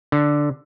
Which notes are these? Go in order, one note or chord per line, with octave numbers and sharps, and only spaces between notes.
D3